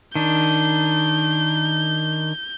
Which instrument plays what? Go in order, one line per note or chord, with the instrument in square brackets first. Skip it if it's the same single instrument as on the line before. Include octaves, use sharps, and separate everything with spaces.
[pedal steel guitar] D#3 D4 [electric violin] G6